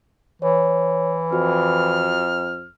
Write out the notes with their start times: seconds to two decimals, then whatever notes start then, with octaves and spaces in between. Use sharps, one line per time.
0.42 E3 C#5
1.33 F2 F#4 F6